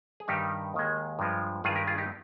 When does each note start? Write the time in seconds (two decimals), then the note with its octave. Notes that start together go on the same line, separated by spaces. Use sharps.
0.20 G#4
0.28 G2 D#3 G3 D#4 G4
0.74 D#2 D#3 G#3
1.19 G2 F3 G#3
1.64 G2 D#3 G#3 F4 G#4
1.76 G4 A#4
1.87 F4 G#4
1.98 D#4 G4